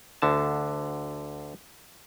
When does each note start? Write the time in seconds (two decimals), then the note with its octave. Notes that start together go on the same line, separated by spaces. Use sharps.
0.22 D2 D3 A5